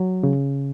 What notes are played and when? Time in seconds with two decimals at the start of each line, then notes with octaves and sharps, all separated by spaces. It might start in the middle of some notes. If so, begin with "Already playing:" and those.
Already playing: F#3
0.23 C#3